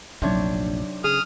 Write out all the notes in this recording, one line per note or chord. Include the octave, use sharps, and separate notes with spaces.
F1 A#1 C3 F#3 D4 D#4 C#5
C#3 G#4 D#6 F6